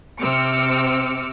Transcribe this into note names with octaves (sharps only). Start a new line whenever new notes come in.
C3 C4 D6 E6 F6 C#7